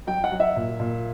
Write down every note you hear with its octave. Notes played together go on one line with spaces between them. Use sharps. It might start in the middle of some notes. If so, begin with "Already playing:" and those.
F#3 G5
F#5
F#3
E5
A#2
A#2